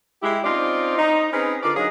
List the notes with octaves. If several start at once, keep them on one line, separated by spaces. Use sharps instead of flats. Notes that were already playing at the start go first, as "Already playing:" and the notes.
G#3 E4 G4
C4 C#4 D#4 F4 C5 D5
D#4
C4 C#4 D#4 G#4 B4
D3 F4 A#4 D5
F#3 D4 D#4 G#4 C#5 F5